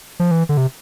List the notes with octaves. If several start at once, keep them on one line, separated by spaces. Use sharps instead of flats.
F3
E3
D3
C3